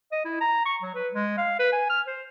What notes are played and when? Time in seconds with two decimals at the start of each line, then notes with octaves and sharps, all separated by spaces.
0.12 D#5
0.25 E4
0.41 A#5
0.65 C#6
0.82 F#3
0.95 B4
1.14 G#3
1.37 F5
1.59 B4
1.72 G#5
1.90 F6
2.07 C5